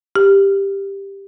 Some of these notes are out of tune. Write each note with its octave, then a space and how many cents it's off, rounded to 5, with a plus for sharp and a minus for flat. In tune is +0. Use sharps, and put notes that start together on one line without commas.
G4 +10